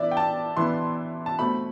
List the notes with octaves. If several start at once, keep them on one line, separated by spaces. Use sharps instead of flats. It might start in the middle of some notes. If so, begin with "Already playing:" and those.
Already playing: E3 B3 E4 D5 E5
G5
A5
E3 B3 E4 C6
A5
B2 A3 C4 B5